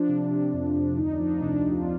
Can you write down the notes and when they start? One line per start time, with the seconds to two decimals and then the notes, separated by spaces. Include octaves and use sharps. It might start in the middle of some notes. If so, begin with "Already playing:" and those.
Already playing: F3 D4
0.08 C3
0.31 C3
0.53 F2
0.75 F2
0.97 D2 D#4
1.12 D4
1.19 F3
1.27 D#4
1.42 C3 D4
1.57 D#4
1.64 D2
1.71 F4